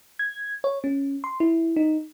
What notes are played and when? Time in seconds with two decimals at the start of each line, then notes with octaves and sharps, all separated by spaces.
0.19 G#6
0.64 C#5
0.84 C#4
1.24 C6
1.40 E4
1.76 D#4